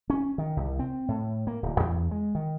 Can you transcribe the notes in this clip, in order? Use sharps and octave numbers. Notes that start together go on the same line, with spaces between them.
C#4
D#3
C2
C4
A2
A#3
D1
E2
G#3
D#3